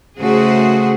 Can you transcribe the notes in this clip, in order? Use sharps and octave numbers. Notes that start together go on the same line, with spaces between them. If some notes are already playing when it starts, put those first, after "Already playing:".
C#3 A3 F#4 G#4 C5